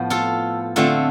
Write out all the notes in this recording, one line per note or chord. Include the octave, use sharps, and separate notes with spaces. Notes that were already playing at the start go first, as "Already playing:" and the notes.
Already playing: A2 F3 B3
F4 A4
D3 A3 C4 F4 A4